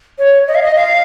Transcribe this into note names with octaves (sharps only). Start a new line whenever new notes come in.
C#5
D#5
F5
D#5
F5